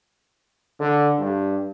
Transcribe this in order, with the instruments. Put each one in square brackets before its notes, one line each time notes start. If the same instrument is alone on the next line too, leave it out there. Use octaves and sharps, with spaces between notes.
[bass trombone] D3
G2